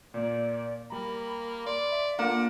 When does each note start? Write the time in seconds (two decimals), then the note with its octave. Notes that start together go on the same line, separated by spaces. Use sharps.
0.14 A#2 A#3 D5
0.90 G3 A#3 A#5 B5
1.66 D5 C6
1.91 E5
2.19 A#3 D4 F4 F#5 D6